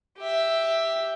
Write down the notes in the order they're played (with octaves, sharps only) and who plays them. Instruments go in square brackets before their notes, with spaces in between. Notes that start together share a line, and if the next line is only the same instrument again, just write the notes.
[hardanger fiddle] G4 E5